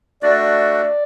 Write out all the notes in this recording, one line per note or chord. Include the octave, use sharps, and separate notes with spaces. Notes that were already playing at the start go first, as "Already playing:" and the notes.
A3 D4 F#4 D5
D5